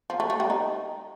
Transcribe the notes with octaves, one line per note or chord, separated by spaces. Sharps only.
F3
A3
A3
G3
D#4